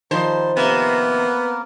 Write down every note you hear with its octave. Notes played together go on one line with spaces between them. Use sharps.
D#3 F3 G3 D#4 C5 A5
C3 A#3 B3 A#4